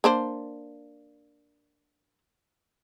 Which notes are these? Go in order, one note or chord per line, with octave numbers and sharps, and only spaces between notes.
A#3 D4 C5